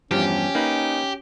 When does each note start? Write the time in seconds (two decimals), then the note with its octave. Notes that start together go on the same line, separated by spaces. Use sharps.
0.11 E2 G2 F3 C#4 G4
0.55 A#3 D#4 B4